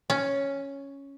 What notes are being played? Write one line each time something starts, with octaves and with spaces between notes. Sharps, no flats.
C#4